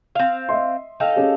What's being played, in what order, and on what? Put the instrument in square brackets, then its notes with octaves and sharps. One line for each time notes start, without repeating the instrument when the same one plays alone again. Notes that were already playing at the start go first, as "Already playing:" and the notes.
[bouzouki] C4 F5
[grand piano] D#5 E5 C6
[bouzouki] D#4 A4 F5 [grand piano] G5
[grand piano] C#4 G4 G#4